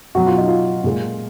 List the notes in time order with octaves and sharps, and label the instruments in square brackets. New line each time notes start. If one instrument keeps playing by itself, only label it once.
[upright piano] B2 F#3 F#4
F4
D#4
F4
A#2 G#3